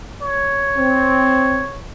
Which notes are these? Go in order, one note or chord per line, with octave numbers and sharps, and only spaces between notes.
C#5
C4